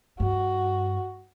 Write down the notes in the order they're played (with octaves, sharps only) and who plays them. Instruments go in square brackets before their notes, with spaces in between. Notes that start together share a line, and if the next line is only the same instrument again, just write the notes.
[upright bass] G2 [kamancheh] F#4